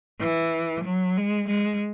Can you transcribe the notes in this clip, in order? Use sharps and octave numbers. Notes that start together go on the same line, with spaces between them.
E3
F#3
G#3
G#3